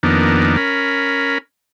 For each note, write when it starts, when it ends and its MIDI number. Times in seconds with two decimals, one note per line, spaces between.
0.03 0.56 41
0.03 0.56 51
0.03 0.56 58
0.03 0.56 59
0.03 0.56 62
0.57 1.38 61
0.57 1.38 70
0.57 1.38 83